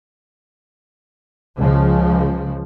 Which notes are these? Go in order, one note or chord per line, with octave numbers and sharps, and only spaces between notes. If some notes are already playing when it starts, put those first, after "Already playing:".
C#2 C#3 F3